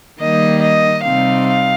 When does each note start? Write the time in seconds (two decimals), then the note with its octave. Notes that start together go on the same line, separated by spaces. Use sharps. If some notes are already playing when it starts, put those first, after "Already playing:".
0.20 D#3 G3 A#3 D#4 D#5
0.62 D#5
1.04 C3 G3 C4 D#4 F5
1.46 F5